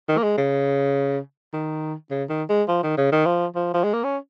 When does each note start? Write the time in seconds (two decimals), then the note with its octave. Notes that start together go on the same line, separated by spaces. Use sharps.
0.08 D#3
0.18 A#3
0.23 G#3
0.37 C#3
1.53 D#3
2.10 C#3
2.29 D#3
2.49 G#3
2.68 F3
2.83 D#3
2.97 C#3
3.12 D#3
3.26 F3
3.55 F3
3.74 F3
3.84 G#3
3.93 A#3
4.04 C#4